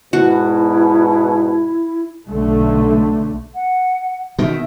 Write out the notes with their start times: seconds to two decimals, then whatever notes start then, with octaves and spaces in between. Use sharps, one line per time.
0.13 E2 G#2 B2 E4 F#4
2.28 B1 D3 A3
3.54 F#5
4.39 B2 D#3 E5